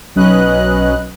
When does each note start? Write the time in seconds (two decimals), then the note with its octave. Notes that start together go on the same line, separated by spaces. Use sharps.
0.15 B1 F#3 C#4 B4 D#5 F#6